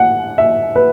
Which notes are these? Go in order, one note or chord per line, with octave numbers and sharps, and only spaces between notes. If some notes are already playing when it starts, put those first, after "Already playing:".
Already playing: F#5
E5
B4